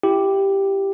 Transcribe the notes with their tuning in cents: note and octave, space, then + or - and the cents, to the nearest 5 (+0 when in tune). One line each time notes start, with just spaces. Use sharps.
E4 +25 G4 +0